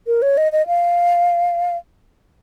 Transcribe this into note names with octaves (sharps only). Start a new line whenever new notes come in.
A#4
C#5
D#5
D#5
F5